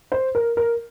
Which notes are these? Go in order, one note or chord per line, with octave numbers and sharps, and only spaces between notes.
C5
A#4
A#4